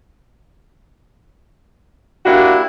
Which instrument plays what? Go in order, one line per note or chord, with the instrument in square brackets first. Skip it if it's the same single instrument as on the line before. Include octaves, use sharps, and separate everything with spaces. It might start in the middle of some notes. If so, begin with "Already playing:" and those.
[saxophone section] A#3 D4 F#4 [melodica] E4 G4